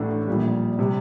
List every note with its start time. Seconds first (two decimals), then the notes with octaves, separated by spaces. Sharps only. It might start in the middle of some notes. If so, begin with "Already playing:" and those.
Already playing: A1 A2 A3 D4 F#5
0.27 A#1 A#2 G3
0.79 C3 G3